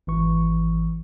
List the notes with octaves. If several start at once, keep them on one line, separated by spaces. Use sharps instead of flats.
G#1 E3 C#6